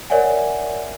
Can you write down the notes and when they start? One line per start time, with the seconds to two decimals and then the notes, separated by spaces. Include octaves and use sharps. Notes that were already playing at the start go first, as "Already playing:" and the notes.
0.10 A#4 C#5 D5 E5 F#5 G#5